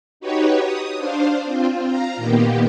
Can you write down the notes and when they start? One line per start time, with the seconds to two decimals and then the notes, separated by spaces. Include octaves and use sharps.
0.20 D#4 F#4 G4 B4 C#5
0.61 D#6
0.96 D4 C5 F5
1.45 C4 F4
1.85 F5 A#5
2.17 A#2 D#3 A#3 B3 G4